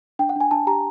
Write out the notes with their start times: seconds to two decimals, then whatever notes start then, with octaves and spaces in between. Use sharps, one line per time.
0.19 D4 G5
0.29 F#5
0.36 D4 G#5
0.51 D4 A5
0.67 G4 A#5